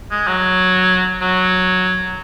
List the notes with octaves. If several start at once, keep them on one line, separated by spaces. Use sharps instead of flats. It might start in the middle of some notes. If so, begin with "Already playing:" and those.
G#3
F#3
F#3